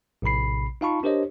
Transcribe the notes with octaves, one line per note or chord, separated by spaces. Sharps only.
A#1 A2 C3 B5 C7
D#4 F4 F5 A5 B5 C#6
D4 G4 A#4 C5 C#5 D#5